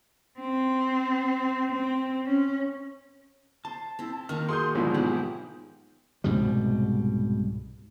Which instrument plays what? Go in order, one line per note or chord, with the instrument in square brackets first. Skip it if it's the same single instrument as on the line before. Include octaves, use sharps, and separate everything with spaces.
[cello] C4
C4
C#4
[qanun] C5 [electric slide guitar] A5
[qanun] C4 E4
[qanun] D#3 A#3 C#6 [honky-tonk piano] F6
[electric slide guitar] F#4 G#4 [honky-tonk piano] C6 D#6 G6
[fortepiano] B1 G#2 F3 [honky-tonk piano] D3 E3
[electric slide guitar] B3 D#4 G#4 [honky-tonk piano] G4 [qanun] F#5
[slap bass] C2 G#2 B2 G3